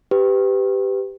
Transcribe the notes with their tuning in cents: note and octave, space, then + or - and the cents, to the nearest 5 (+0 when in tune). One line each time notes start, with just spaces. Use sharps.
G4 +0 B4 +20